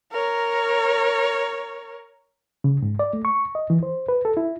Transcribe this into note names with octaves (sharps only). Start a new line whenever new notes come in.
A#4 C#5
C#3
G#2
D5
A3
C#6
D#5
E3
C5
B4
A4
E4